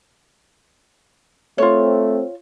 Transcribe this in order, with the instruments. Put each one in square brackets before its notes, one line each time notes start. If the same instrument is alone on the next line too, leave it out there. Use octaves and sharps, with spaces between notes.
[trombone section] A3 C4 [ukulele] F4 C#5